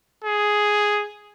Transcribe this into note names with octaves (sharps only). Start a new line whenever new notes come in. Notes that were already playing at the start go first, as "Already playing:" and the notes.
G#4